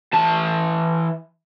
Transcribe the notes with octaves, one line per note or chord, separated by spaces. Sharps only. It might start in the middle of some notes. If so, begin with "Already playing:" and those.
E3 A5